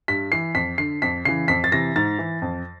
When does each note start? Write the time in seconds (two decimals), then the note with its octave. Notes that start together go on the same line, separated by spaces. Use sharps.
0.08 G2 B6
0.32 E3 C7
0.54 F2 B6
0.78 D3 C7
1.02 F2 B6
1.25 C#3 E3 C7
1.48 F2 B6
1.64 A6
1.72 C3 E3 A#6
1.96 G#2 A6
2.19 E3
2.42 F2